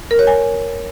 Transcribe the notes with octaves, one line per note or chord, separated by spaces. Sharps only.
A#4
C#5
G#5